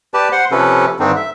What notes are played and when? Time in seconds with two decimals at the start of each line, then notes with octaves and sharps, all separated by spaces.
0.14 G4 B4 D5 A5
0.32 C5 F#5 C6
0.51 C3 F3 C#4 A4 B4
1.00 G2 D3 D#3 C4 D4 D#4
1.16 E5